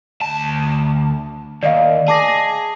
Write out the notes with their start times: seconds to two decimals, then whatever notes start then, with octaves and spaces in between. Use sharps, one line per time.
0.22 D2 A5
1.63 D#2 D5 D#5 F5
2.08 G#4 A5 D6 A#6
2.28 A#6